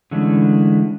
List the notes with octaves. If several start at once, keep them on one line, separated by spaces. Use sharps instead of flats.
D3 E3 G#3 A3 C#4 D4